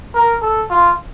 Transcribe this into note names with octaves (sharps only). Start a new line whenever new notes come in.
A#4
A4
F4